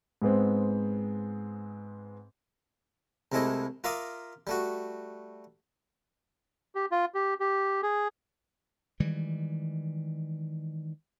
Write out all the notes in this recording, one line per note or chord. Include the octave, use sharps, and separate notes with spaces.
G#2 G#3 B3 C4
C2 C3 G#3 A3 E4 D#5
F4 A#4 E5 F5 D6 D#6
G3 A3 F#4
G4
F4
G4
G4
G#4
D#3 E3 G3 G#3